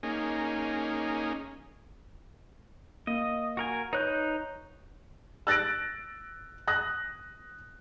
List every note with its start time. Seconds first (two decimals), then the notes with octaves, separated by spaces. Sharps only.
0.03 A#3 C#4 D#4 G#4
3.07 A#3 D#5
3.57 F#4 A#4 G#5
3.93 D#4 B4 C#5 F#6 G6
5.47 E6 F#6 A6 A#6 D7
6.68 D#6 F#6 A#6